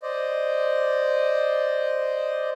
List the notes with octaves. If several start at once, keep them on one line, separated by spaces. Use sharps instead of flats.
C5 D5 D#5